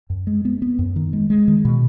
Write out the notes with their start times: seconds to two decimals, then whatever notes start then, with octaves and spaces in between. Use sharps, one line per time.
0.10 F#2
0.27 G#3
0.45 B3
0.62 B3
0.79 F#2
0.96 D#3
1.13 G#3
1.30 G#3
1.48 D#3
1.65 B2